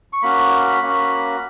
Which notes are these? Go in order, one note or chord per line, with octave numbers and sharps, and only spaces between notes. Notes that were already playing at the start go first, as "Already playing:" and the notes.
C#6
A#3 C#4 F#4 B5
A#3 C#4 F#4